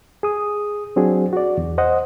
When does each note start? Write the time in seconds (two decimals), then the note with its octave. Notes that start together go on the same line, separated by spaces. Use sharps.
0.23 G#4 D#6
0.96 F#3 C4 D4 F#4 G#4
1.33 F#4 D5
1.58 E2
1.78 C5 D#5 F#5